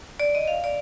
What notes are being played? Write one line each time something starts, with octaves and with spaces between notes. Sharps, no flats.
D5
D#5
F5
D5